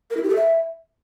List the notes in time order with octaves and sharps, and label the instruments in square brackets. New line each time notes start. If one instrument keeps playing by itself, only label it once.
[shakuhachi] A#4
E4
G4
A4
E5